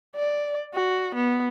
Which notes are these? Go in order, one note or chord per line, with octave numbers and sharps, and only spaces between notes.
D5
F#4
B3